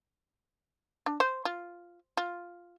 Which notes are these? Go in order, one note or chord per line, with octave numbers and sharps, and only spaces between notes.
D4
C5
F4
F4